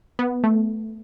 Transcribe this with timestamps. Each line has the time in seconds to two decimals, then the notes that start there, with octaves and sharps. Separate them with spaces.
0.19 B3
0.44 A3